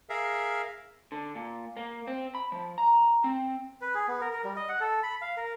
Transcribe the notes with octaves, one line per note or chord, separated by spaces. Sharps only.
G#4 A#4 E5 F5
D3
A#2
A#3
C4
B5
F3
A#5
C4
B4
G#4
B3
A#4
A#4
G3
D#5
F#5
A4
B5
F5
A#4